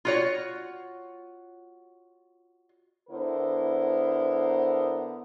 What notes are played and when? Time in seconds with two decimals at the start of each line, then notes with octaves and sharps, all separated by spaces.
0.05 F4 F#4 C#5
3.09 D3 B3 E4 A#4 C5